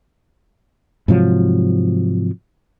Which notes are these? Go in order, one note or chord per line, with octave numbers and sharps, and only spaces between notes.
G#2 C3 F3 F#3